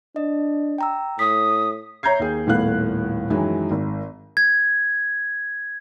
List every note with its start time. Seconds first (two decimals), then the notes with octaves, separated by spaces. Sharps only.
0.16 D4 D#5
0.78 G5 A#5 E6
1.19 A2 D#6 B6
2.03 C#5 E5 A#5 G6 G#6 C7
2.20 D#2 G#4
2.47 D#1 A2 B3 F5 F#6
3.30 F#2 D#3 E3 F#3 G#3 E4
3.71 G#1
4.37 G#6